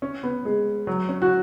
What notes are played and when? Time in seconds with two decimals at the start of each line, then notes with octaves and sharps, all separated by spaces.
0.02 C#4
0.23 B3
0.45 G#3
0.87 F#3
1.09 C#4
1.22 F#4